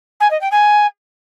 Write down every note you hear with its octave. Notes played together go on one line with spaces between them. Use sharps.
G#5
D#5
G5
G#5